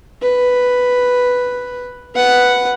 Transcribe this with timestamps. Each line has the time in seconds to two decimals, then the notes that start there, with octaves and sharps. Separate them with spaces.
0.22 B4
2.14 B4 F#5